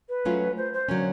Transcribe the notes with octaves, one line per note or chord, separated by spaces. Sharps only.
B4
F#3 A3 C#4 F4
C5
C5
D3 F#3 A#3 C#4 C#5